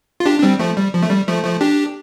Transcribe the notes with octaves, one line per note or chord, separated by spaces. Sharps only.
F4
D4 G4
D4
G3 C4
F3 A3
G3
F3
A3
G3
F3 A3
F3 A3
D4 G4